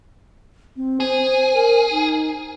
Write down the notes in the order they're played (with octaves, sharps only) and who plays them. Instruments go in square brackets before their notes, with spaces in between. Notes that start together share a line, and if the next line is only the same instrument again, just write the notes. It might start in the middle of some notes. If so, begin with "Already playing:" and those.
[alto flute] C4
[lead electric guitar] G#4 [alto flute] C5
[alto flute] A#4
D#4